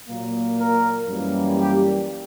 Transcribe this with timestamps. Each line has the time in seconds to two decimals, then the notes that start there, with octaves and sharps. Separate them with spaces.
0.09 A#2 F#3 A#3
0.59 A#4
1.08 F#2 E3 G3 A#3
1.57 G4